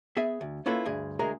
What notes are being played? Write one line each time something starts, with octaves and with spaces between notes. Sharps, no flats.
B3 G#4 E5 G#5
D2
A#3 C#4 E4 F4 A4 B4
D2 G2 G#4
D2 G#3 G#4 A#4 A#5